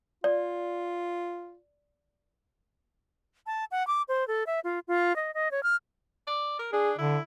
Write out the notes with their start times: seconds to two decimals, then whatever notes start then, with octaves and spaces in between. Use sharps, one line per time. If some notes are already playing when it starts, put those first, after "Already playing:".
0.24 F4 D5
3.46 A5
3.71 F#5
3.87 D6
4.08 C5
4.28 A4
4.47 E5
4.64 F4
4.88 F4
5.16 D#5
5.34 D#5
5.51 C#5
5.63 F6
6.27 D5
6.59 A#4
6.73 D4 G#4
6.98 D3 E4